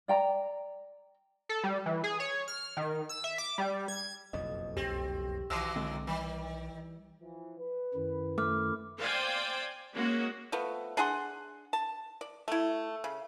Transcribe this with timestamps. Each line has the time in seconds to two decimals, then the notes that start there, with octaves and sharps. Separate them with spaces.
0.08 D5 G5 A#5
1.49 A4
1.64 G3
1.86 E3
2.04 G#4
2.20 C#5
2.48 F6
2.77 D#3
3.09 E6
3.24 E5
3.38 D6
3.58 G3
3.88 G#6
4.33 F#1 B1 F2 D#5
4.77 C2 C4 G4
5.50 B1 D#3 E3 F#3 D6 E6
5.76 D3 G#3 C4
6.07 D#3 E3 G3
7.21 E3 F3
7.59 B4
7.94 F#2 D#3 E4
8.38 A3 D6 F6
8.99 C5 D5 F5 G5 G#5
9.93 G#3 A#3 C#4 F#4
10.52 F3 A3 B3
10.97 D4 G#4 F#5 C6
11.73 A5
12.21 D5
12.48 A3 E4
13.04 C#3